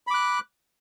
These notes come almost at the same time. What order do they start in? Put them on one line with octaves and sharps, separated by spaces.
B5 D6 F#6